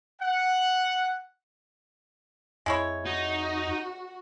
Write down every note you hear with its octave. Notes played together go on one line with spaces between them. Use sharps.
F#5
F2 G#3 E4 C#5
D#4 F#4